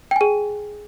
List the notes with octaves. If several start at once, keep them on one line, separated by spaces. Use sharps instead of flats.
G#4 G5 G#5